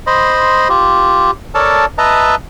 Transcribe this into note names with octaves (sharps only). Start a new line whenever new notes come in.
C5 D#5 B5 C6
F4 G4
A4 A#4 C#5 D5 A5
B4 D#5 E5 A5 A#5